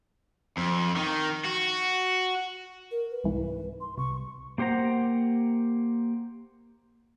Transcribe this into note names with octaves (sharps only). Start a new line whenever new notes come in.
F2
D#3
F#4
A#4
B4
C2 G#2 E3
C6
C2 C#6
A#3 G4 C5 F#5 A#5